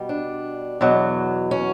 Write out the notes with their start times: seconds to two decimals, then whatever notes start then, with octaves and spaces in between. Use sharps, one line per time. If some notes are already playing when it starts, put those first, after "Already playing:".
Already playing: B2 G3
0.09 D4
0.81 E2 B2 F#3
1.51 C#4